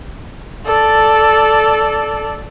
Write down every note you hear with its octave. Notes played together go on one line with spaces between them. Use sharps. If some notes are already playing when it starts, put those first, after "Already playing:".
A4 D5